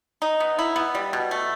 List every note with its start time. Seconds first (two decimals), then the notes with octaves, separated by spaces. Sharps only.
0.22 D#4
0.40 B3
0.59 E4
0.76 B3
0.95 G3
1.13 B2
1.31 A3